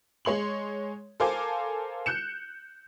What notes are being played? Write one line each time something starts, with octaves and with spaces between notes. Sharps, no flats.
G#3 C#5 C6 F#7
A4 A#4 C5 F5 G#5 D6
F#6 G6 C#7 E7